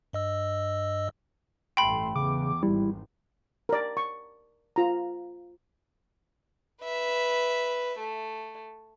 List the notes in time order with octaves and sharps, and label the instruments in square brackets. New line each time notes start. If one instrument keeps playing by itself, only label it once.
[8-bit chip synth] G2 D#5 E6
[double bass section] A1 G2 A3 [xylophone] G5 B5 [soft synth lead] C6
[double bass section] E2 [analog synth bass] C#3 [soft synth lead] D6
[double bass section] G#1 [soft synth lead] G3 [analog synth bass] E4
[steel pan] A#4 D5
C#6
F4 A#5
[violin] B4 E5
A3